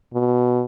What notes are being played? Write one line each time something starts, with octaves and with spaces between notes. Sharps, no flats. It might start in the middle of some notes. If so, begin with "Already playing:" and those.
B2